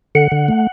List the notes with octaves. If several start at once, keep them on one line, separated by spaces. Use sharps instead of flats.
D3 F#5
D3
A3